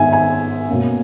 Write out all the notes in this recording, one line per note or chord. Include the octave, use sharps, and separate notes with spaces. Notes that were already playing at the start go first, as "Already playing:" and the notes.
Already playing: G#2 D#3 G#3 B3 E5 G#5
G#5
B2 A#3 C#4